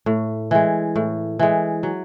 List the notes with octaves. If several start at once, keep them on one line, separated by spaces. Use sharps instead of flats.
A2
E3 G#3
A2
E3 G#3
F#3